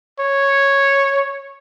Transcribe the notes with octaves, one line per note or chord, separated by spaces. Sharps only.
C#5